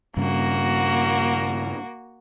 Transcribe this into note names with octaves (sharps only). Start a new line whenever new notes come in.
G2 C#3 A#3 F#4